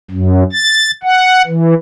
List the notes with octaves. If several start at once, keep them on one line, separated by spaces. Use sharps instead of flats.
F#2
A6
F#5
E3